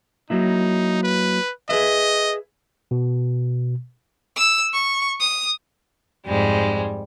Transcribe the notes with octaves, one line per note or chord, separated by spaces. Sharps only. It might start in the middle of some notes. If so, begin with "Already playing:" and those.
F#3 A#3 D#4 E4
B4
G#4 B4 D#5 E5
B2
E6
C#6
D#6
F2 G#2 G3 G#3